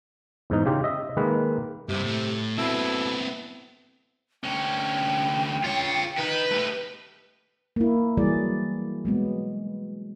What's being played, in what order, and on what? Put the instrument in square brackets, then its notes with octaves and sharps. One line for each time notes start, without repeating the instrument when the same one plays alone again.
[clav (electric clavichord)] E2 G#2 D#4
C#3 F4 G4
D#5 E5
D#3 G#3 A#3 B4
[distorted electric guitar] G2 E4 [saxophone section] C3
[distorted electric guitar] A2 A3
[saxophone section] B2 E4 A4 [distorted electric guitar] B3 C4
[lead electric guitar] D2 C#4 [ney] G5
[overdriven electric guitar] F4 C#5
[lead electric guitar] D#3 D#4 [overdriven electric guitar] B4
[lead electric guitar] A3 G4
[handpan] A#3 E4
E3 F#3 G3 E4 G#4 D5
F#3 G#3 B3